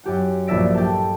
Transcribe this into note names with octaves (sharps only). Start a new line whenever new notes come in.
F#2 G4 F#5
A#1 G2 D5 E5 A#6 D7
G4 A4